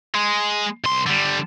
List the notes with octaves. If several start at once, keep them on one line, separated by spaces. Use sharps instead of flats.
G#3
C2 C6
D3 G3